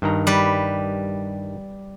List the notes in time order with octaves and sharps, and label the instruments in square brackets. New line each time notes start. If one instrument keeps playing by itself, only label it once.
[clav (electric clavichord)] G2 D#3 A#5
[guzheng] G3 B4